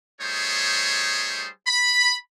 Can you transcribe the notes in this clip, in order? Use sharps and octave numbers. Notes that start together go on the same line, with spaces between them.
G3 A3 D#4 G#4 C5 C#5
B5